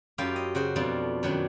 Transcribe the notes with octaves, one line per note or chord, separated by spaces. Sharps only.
F#2 E4 F4 G4 F5
D#5
C#3 F#4 C5
F2 B2 A3 D4 F4
F#2 D#3 F#3 B3 D4